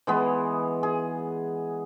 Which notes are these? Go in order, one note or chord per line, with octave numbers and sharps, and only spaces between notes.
E3 G#3 B3
G#4